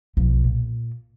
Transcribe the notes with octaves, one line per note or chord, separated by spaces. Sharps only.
B1 F3
A#2